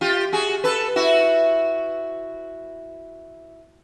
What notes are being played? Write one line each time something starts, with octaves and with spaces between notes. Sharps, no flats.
F4 G4
F#4 G#4
A4 B4
E4 F#4